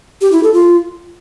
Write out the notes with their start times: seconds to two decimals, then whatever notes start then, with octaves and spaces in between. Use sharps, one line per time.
0.21 G4
0.32 E4
0.43 A4
0.54 F4